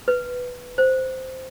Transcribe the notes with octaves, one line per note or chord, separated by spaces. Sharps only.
B4
C5